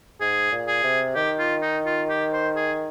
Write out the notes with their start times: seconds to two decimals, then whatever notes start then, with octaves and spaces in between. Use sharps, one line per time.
0.20 G#2 G#4
0.51 A#2
0.67 G#4
0.83 C3
1.15 D#3 G4
1.39 F4
1.62 D#4
1.86 F4
2.09 G4
2.33 C5
2.56 G#4